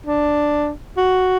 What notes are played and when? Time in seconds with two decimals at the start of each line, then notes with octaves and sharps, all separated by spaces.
0.06 D4
0.97 F#4